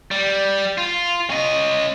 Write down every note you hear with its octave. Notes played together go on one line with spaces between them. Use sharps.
G3
F4
C#4 D#5